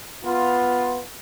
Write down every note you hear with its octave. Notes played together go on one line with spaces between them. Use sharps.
B3 F4